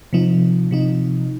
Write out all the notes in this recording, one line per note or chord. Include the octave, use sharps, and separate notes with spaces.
C3 F3 D#4
C3 F3 D#4